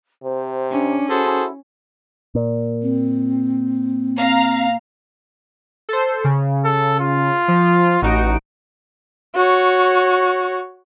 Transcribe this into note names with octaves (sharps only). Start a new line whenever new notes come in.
C3 C5
C#4 D4
E4 F#4 G#4 A4 C5
A#2
C4
C4 F5 A#5
A4 C5
C#3
A4
F4
F3
A1 D#4 F#4 D7
F#4 C#5